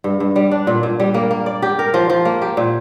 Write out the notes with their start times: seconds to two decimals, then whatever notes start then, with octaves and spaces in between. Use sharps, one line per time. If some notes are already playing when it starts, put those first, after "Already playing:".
0.04 G2
0.20 G2
0.36 G3
0.51 D4
0.67 A#2
0.83 A#2
1.00 G3
1.14 A#3
1.31 A#3
1.46 D5
1.62 G4
1.79 A#4
1.94 F3
2.10 F3
2.25 A#3
2.42 G4
2.57 A#2